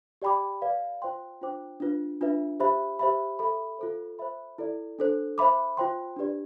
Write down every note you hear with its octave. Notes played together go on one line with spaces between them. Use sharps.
G4 D5 G5 B5 D6
B4 D5 F5
F4 C5 G5 C6
D4 F4 C5 G5 D6
D4 F4 B4
D4 F4 B4 E5
G4 C5 E5 B5
G4 C5 E5 B5
A4 E5 B5
F4 A4 C5
C5 E5 B5
E4 A4 D5
D4 A4 C5
C5 E5 B5 D6
F4 C5 G5 C6
D4 G4 B4 D5